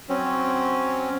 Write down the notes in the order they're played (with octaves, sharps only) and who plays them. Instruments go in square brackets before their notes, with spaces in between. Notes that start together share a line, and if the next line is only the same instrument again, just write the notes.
[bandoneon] F#3 C4 C#4